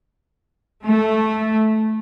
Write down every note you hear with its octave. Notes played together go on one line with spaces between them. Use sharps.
A3